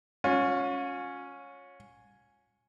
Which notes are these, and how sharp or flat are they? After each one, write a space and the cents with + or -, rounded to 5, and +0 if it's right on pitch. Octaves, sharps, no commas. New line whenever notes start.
C#4 +0 F4 +45